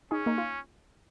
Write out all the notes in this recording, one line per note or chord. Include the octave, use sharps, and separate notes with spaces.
C#4 D#4 G#4
A#3 D#4
F4